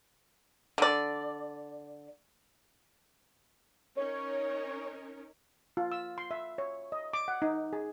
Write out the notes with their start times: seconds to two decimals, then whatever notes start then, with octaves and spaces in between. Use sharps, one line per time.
0.78 D3 D5
3.97 C#4 D#4 A#4 C#5
5.77 F4
5.92 E6
6.18 C6
6.31 E5
6.58 C#5
6.92 D#5
7.13 D6
7.28 F#5
7.42 D#4
7.73 G#4